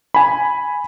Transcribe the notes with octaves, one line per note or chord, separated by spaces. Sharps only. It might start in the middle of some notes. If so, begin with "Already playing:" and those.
G#5 B5